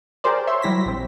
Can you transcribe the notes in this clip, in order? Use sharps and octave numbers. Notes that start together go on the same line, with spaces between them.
G4 G#4 A#4 C5 D5
C#5 E5 C6
F#3 G3 E4 A#6 B6
A#1 C4